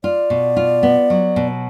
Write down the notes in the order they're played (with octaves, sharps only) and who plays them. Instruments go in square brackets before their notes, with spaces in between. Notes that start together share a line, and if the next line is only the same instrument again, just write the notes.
[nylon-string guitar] F4 [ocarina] D5
[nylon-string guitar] B2
F4
B3
F#3
B2